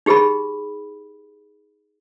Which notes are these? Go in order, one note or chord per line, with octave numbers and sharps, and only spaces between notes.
D#4 G4 G#4 B4 B5